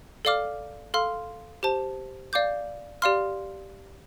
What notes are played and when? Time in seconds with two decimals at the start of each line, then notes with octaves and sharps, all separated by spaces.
0.25 A4 D5 F5 D6 F6
0.94 A4 F5 C6 F6
1.63 G4 C5 A5
2.33 D5 F5 D6 G6
3.02 G4 D5 F5 C6 F6